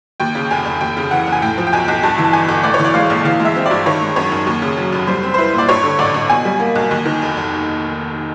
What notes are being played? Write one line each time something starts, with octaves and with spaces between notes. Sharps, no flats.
D#2 G5
C#3
F1 G#5
F1
D#2 G5
C#3
E3 F#5
F1
G#5
A2 G5
F3
G5
B1 G#5
B1
G2 A5
E3
A5
G1 G#5
G1
A2 D5
C#5
E3 D5
G#3 F5
A#1
E3 F5
G#3
E5
C4
D5
G2
D#3 C#5
G#3
F#2 C#5
F#2
D#2
C#3
F#3
F1
G3 C5
C4
C5
E4 B4
A#2 D5
G2 C#5
D3
A1 D5
A1
B2 G#5
G3
A#3
B1
D#2
D#3
F1
F1